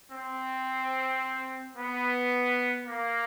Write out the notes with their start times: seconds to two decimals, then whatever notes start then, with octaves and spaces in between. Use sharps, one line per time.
0.11 C4
1.76 B3
2.86 A#3